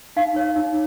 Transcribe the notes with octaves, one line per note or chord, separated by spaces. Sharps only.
D#4 F5
C#5
D#4